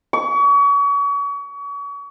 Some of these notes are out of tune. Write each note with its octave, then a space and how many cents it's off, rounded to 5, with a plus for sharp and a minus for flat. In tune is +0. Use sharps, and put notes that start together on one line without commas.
C#6 +35